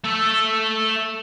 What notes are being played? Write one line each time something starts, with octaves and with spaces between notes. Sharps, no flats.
A3 A4